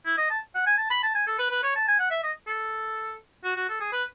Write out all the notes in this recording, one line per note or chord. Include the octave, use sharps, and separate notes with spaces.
E4
D#5
A5
F#5
G#5
A5
B5
A5
G#5
A4
B4
B4
C#5
A5
G#5
F#5
E5
D#5
A4
F#4
F#4
A4
G#4
B4